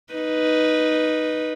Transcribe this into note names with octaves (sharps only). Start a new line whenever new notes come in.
D#4 B4